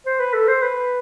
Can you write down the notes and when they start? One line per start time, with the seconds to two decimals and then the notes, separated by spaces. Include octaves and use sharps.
0.06 C5
0.20 B4
0.34 A4
0.48 C5
0.62 B4